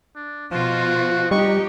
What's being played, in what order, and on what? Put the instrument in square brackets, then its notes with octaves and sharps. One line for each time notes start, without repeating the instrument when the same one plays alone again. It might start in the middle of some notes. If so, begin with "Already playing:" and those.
[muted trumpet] D4
[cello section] B2 F4 [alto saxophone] F3 [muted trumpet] F#4
[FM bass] G3 [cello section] D#4 G4 [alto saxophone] D#5 [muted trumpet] C#6